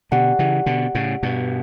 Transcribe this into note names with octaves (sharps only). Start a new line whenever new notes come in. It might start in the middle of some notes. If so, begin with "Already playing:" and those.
B2 D3 G4 D5 F#5 A5
C#3 E3
B2 D3
A2 C#3
G2 B2